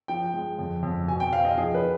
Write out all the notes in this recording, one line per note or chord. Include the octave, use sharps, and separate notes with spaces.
F3 G5
G#3
F2
F2
B2 G#5
G5
C4 F5
D#5
F3 G#4
B4
F3